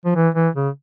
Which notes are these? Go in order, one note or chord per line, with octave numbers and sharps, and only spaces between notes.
F3
E3
E3
C#3